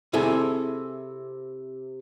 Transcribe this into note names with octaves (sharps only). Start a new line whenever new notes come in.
C3 E4 G#4 A4 G#5